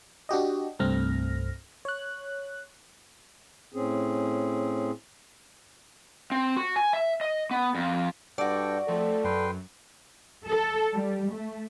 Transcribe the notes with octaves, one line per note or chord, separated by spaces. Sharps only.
D4 F#4 G4 D#5
C2 G2 A3 C4 F6 A#6
C#5 F#6
A2 C4 C#4 G#4
C4
F#4
G#5
E5
D#5
B3
F2
G2 F#4 A4 D5 G5
F3 A3 C4 A4
F#2 B4 G5 C6
A4
G3
A3